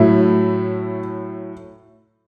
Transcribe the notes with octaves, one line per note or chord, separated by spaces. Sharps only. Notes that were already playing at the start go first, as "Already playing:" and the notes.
Already playing: A2 F#3 A3 E4